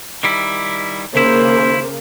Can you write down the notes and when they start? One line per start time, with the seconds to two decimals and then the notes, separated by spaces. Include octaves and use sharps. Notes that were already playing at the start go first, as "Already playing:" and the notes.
0.23 D#3 G3 E4
1.15 D#2 C#3 A#3 E4 C5